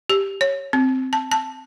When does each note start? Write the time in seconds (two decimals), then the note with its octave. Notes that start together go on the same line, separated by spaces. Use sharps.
0.10 G4
0.41 C#5
0.73 C4
1.13 A5
1.32 A5